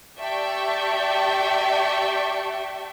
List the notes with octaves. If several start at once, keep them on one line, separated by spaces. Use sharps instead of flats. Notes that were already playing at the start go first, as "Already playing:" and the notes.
G4 D5 E5 G5 A5 C#6